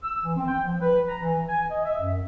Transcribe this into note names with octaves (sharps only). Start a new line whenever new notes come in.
E6
E3
C4
G5
F3
B4
A#5
E3
G#5
D#5
E5
F#2